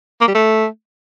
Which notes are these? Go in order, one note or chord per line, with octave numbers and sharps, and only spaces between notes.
A#3
G3
A3